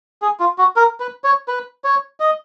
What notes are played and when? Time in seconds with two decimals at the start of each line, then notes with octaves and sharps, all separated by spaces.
0.22 G#4
0.40 F4
0.58 F#4
0.76 A#4
1.00 B4
1.24 C#5
1.48 B4
1.84 C#5
2.20 D#5